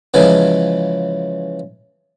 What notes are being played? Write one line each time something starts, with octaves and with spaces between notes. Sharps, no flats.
C#3 E3 F3 G#3